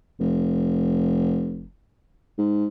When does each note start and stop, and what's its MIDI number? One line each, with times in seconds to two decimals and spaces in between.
0.19 1.68 29
2.38 2.67 44